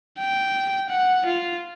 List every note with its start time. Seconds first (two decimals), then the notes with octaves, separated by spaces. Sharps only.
0.19 G5
0.89 F#5
1.26 F4